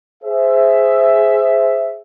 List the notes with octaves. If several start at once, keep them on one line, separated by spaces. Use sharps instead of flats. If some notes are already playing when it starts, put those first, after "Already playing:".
G#4 C5 E5